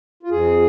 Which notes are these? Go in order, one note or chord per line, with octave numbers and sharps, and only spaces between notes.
F4
F2 G#4